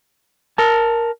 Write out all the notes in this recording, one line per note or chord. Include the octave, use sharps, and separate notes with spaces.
A#4 A5